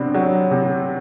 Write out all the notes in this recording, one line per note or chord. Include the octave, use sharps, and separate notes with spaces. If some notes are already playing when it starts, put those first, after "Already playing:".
Already playing: C3 F#3 B3 C4 D4
F#3
C3